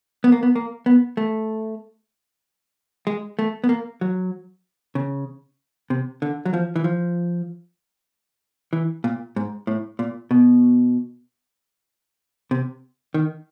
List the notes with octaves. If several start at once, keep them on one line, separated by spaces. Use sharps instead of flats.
B3
A#3
B3
A#3
B3
A3
G#3
A3
B3
A#3
F#3
C#3
C3
D3
F#3
F3
E3
F3
E3
A#2
G#2
A2
A#2
B2
C3
D#3